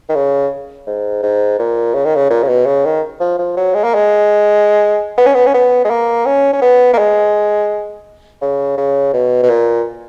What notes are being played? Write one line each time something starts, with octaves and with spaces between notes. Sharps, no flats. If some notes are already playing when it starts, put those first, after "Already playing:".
D#3
C#3
G#2
G#2
A#2
C#3
D#3
C#3
A#2
C#3
B2
C#3
D#3
F3
F3
F#3
G#3
A#3
G#3
B3
C#4
B3
C#4
B3
G#3
A#3
C#4
C#4
B3
A#3
G#3
C#3
C#3
B2
B2
A#2